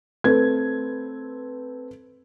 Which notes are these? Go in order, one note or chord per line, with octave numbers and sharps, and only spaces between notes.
A3 C4 B4 G#6